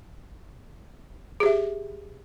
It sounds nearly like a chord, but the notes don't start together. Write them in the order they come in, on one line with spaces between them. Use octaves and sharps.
G#4 G4 E5